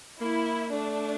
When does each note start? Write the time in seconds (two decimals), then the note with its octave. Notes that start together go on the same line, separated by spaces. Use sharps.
0.21 A#3 E4
0.72 A3 D4